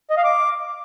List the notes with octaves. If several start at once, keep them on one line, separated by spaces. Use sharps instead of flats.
D#5
F5
D6